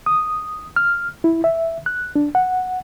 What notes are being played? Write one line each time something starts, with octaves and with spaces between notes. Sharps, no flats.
D#6
F6
E4
E5
F#6
D4
F#5